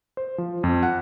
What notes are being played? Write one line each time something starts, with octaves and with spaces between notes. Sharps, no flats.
C5
F3
F2
F#5